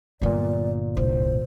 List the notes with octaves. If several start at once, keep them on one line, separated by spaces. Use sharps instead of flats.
G1 A#2 F#3 B3 D5
D1 C2 C5